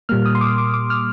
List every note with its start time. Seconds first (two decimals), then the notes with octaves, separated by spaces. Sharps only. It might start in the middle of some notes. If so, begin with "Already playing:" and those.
0.09 A#2 G3 A#3 F6
0.26 D#6
0.35 C6
0.41 D6
0.58 D6
0.74 D6
0.90 F6